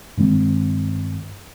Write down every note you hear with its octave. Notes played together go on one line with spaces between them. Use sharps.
G2 D#3 G#3 C4